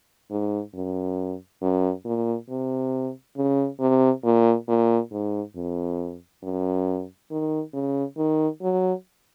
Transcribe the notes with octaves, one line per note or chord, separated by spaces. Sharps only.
G#2
F#2
F#2
A#2
C3
C#3
C3
A#2
A#2
G#2
F2
F#2
D#3
C#3
D#3
F#3